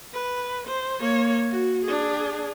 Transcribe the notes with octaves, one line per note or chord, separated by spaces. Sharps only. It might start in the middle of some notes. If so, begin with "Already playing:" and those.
B4
C5
A#3 C#5
F#4
D4 G#4